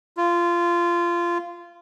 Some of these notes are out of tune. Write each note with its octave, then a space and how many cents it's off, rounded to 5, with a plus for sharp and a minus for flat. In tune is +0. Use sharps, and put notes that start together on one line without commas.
F4 -20